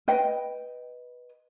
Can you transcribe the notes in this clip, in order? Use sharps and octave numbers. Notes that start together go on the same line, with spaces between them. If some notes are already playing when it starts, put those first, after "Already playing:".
B4 D#5 G5